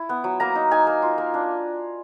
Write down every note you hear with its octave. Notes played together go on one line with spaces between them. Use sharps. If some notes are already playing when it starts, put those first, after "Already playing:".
Already playing: E4
B3
F#3
A#3 A#5
D#4
D#4 G#5
A#3
F4
A#3
D4